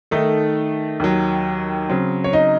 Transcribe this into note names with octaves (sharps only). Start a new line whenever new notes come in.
D#3 A3 D#4 A4
D#2 D#3 F#3
C#3 F#3 C4
C#5
D#4 D#5